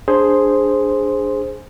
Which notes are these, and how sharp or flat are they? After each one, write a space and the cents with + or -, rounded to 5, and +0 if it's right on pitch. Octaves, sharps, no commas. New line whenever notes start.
D4 +0 G#4 +0 C5 +0